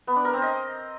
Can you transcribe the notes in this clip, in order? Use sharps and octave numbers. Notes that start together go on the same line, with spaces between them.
B3
D4
A#4
C4
D#5